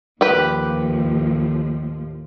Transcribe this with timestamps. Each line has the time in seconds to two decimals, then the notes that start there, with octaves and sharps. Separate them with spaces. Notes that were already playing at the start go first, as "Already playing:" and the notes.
0.21 D#2 A2 F3 G4 B4